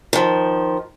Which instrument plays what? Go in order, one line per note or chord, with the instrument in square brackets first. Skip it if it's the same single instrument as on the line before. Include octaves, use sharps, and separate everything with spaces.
[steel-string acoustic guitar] D#3 F3